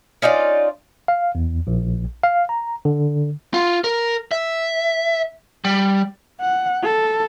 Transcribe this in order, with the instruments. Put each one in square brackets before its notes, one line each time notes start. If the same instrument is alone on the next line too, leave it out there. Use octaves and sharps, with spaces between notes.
[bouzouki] C#4 D#4 F4 D5
[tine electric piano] F5
E2
A#1
F5
A#5
D3
[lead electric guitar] F4
A#4
E5
G3
[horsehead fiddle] F#5
A4